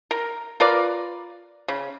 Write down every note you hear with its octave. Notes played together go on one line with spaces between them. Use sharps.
A#4
F4 A#4 B4 D5
C#3